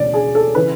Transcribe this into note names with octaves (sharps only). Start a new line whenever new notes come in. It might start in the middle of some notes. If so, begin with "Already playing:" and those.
Already playing: E1 D2 C#3 E3 D5
G#4
A4
C#3 E3 B4